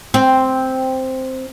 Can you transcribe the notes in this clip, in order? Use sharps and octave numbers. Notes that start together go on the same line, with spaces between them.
C4